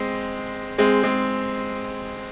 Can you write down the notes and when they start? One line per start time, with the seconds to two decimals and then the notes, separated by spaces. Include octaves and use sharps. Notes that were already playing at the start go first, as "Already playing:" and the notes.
Already playing: G#3 C4
0.78 G#3 C4
1.03 G#3 C4